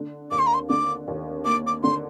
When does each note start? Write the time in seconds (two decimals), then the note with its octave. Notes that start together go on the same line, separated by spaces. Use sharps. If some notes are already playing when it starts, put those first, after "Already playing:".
Already playing: D3
0.31 D#2 D6
0.39 C6
0.47 A#5
0.54 C6
0.69 D3 D6
1.08 D#2
1.45 A#3 D6
1.67 D6
1.83 D3 C6